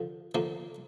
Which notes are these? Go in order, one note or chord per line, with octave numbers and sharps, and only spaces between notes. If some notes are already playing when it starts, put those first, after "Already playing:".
Already playing: D3 F3
D3 F3 A#3